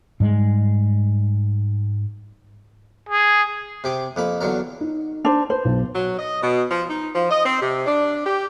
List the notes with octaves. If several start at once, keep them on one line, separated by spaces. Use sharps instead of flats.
G#2 G3 G#3
G#4
C3 G4 D6
F2 A#3 B5
E2 D3 F#3 A#4
D#4
D4 C5
B4 C5
B1
F#3
D#5
B2
F3
D#4
F3
D#5
C4
C3
D4
G4